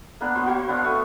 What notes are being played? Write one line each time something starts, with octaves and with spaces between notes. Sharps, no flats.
A#3 B3 D4 B4
B3 F#4 C5 C#5
F#4 C5 F5
B3 D4 C#5 F5
A3 B3 C#6 D#6